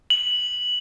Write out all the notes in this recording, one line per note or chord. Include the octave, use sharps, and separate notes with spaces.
F#7